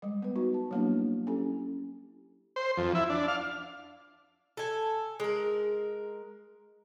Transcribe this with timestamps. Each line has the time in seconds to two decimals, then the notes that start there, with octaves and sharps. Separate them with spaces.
0.02 G3 G#3
0.22 B3 B4
0.36 D#4 F#4
0.54 A5
0.71 F#3 G3 A#3 B3 D4 E4
1.27 C#4 E4 G4 A4
2.56 C5
2.77 F2
2.95 E4
3.10 D4
3.28 F5
4.57 A4 G#5
5.20 G#3 A#4